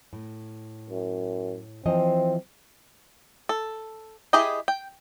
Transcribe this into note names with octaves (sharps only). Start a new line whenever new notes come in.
A2
F#2
E3 F3 C4 D#5
A4
E4 G4 G#4 D#5 G5
G5